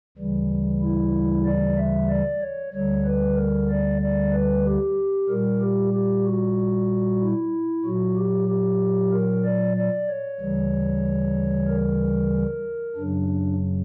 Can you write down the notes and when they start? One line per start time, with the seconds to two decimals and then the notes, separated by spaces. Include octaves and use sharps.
0.18 D2 C#3 E3 G3
0.82 E4
1.45 D5
1.77 E5
2.09 D5
2.41 C#5
2.73 D2 D3 G3 C#5
3.05 B4
3.37 A#4
3.70 D5
4.01 D5
4.33 B4
4.65 G4
5.29 A#2 G3 A#4
5.61 G4
5.93 G4
6.25 F#4
7.21 E4
7.85 A#2 F#3 F#4
8.16 G4
8.48 G4
9.12 A#4
9.44 D5
9.77 D5
10.08 C#5
10.41 D2 C#3 E3 G3
11.68 A#4
12.96 F#2 C#3 F#3 D4